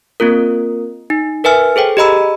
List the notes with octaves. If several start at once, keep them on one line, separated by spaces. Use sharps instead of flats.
A#3 C4 F4 A#4
D#4
A#4 B4 E5 G#5 F6
G#4 A4 C5 G5
G4 G#4 D#5 A#5 B5 E6